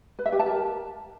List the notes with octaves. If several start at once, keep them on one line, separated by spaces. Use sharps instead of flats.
B4
E5
G4
A5
A#4